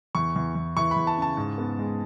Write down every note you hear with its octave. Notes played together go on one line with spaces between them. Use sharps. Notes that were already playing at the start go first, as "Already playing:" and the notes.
E2 C#6
E2
E2
E3 C#6
B5
E2
A5
C#3 A5
G#2
B3
G#3